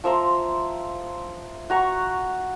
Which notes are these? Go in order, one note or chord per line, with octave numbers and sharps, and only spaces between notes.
F3 E5 A#5 C6
F#4 A#5 C#6